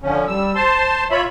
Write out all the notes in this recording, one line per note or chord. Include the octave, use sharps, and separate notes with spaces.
D3 F3 C#4
G3 E6
C5 A5 C6
F4 C#5 E5 B5